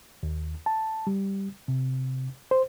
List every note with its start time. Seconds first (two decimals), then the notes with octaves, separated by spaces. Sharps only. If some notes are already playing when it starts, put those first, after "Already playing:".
0.23 D#2
0.66 A5
1.07 G3
1.68 C3
2.51 C5